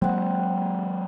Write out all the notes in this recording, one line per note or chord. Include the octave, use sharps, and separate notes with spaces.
F#3 G#3 A#3 C4 F#5